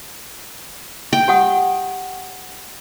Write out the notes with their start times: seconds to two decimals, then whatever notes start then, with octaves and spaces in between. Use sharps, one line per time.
1.13 G5
1.28 G4 F#5 D#6